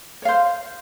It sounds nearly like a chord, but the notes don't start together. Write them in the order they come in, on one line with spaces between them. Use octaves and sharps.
C#5 F5 C5